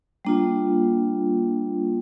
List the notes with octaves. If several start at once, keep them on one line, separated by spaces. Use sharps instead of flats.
G3 A#3 D4 F4